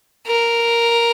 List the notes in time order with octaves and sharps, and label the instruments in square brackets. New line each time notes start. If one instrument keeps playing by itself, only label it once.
[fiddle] A#4